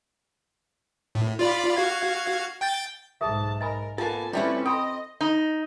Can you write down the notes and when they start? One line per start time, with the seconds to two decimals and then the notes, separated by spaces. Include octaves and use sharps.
1.15 A2
1.39 F4 D5 B5
1.76 F#4 F5 G#6
2.61 G5 G6 A6
3.21 B1 G#2 G#4 A4 E5 A5
3.61 A#4 D#5 G#5 B5
3.98 A#3 B3 F4 A4 G#5 A5
4.33 G3 A3 C4 C#4 E4 B4
4.66 A4 D#5 G5 B5 C6
5.21 D#4